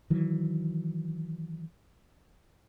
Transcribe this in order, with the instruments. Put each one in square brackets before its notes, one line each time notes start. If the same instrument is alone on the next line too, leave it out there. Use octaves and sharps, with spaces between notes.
[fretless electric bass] D#3 E3 F#3